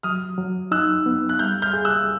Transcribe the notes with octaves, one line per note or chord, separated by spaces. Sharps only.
F#3 D#6 F6
F#3
D#4 E6 F#6
B3
F#6
G3 F6 G6
F6 G6
G#4
E6 F#6